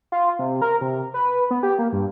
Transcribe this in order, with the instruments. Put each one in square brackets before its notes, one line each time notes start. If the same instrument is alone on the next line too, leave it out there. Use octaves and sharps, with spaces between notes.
[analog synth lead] F4
C3
A#4
C3
B4
B3
G4
A#3
G2